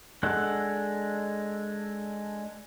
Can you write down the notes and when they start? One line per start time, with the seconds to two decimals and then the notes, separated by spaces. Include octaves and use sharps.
0.23 G#3 D4 A4 F#5